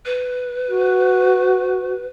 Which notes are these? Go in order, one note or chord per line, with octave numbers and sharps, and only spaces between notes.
B4
F#4